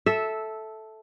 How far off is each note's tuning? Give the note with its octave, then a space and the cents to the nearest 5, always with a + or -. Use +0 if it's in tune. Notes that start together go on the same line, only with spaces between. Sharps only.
A4 -5 E5 -10